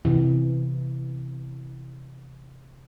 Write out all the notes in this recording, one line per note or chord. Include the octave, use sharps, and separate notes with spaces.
C3 E3